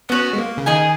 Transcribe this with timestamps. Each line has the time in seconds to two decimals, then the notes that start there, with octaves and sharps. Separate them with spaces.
0.09 B3 C#4 F#4 C#5
0.33 G#3
0.38 A#3
0.58 C#3
0.66 D#3 G#4 D#5 G#5